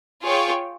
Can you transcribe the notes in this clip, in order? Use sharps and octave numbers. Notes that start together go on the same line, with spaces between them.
F4 G#4 C#5 G5